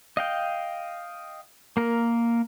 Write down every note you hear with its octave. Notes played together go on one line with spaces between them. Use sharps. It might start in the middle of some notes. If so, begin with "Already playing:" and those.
D#5 F5 G5
A#3 A#4